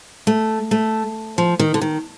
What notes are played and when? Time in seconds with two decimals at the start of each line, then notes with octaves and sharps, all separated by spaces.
0.27 A3
0.71 A3
1.38 F3
1.59 D#3
1.74 D3
1.81 D#3